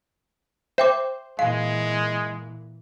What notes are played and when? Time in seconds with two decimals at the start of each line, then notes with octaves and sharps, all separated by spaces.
0.78 C5 E5 G5 D6
1.39 A#2 E3 G#3 F5